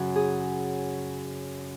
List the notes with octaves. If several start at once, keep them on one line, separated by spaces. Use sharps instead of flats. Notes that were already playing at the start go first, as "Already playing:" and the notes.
Already playing: F#2 C#3 F#3
G#4